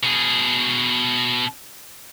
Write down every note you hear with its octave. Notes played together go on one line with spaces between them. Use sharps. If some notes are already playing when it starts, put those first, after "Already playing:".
B2 G#4